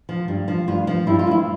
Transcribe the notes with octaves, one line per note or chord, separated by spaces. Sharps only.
F3
G2
F3
G2 F4
F3
G2 E4
F4
F3 E4